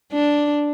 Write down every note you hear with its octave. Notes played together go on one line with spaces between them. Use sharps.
D4